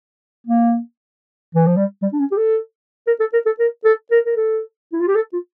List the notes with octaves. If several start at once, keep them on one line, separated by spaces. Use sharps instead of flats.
A#3
E3
F3
G3
G3
D4
C#4
G4
A4
A#4
A4
A#4
A4
A#4
A4
A#4
A#4
A4
E4
F4
G4
A4
F4